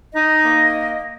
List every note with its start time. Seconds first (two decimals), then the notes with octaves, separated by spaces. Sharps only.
0.14 D#4 D#5
0.44 A#3